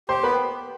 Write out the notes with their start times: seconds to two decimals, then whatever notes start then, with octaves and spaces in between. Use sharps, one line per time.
0.09 G4 C5 C6
0.23 B3 B4 B5